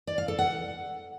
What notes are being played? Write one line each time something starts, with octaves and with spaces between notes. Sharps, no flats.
D5
F5
A4
F#5